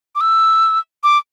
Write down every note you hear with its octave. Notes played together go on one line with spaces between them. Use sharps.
D6
E6
D6